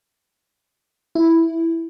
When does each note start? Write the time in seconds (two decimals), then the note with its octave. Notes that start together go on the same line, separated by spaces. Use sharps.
1.15 E4